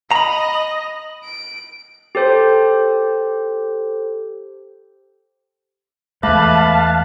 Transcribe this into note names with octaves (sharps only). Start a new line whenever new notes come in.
D#5 A#5 B5
D7
G4 A4 C5
E2 G#3 A3 B4 F5 A5